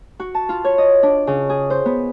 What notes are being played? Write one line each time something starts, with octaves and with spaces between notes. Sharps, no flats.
F#4
A5
F4
C#5
D#5
D4
C#3
G#4
C5
B3